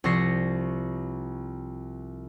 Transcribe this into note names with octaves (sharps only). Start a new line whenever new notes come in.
C2 F3 C#6 A#6 C7